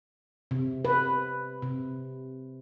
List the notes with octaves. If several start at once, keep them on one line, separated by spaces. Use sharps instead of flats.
C3
B4
C3